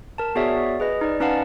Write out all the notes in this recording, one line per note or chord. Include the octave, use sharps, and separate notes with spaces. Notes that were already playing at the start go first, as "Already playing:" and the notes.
A#4 A5
B3 F#4 G#4 C#5 D5 E5
G#4 B4 D#5
D#4 D5
C#4 D#4 B4 F5 F#5 A5